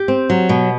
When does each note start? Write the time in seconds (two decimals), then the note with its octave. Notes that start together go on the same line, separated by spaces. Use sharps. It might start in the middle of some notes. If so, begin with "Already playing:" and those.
Already playing: G4
0.08 C4
0.30 F#3
0.49 B2